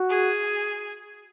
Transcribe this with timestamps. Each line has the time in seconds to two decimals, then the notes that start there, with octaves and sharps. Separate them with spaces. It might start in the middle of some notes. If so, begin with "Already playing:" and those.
Already playing: F#4
0.10 G#4